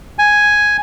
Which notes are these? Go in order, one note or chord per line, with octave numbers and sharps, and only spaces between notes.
G#5